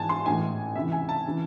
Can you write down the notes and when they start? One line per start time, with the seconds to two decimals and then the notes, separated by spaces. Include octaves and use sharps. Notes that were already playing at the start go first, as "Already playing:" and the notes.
Already playing: G#1 G#2 E3 G#5 A5
0.09 C6
0.26 A1 A2 E3 G#5
0.75 C#2 C3 E3 E5
0.92 G#5
1.09 A5
1.27 C#3 E3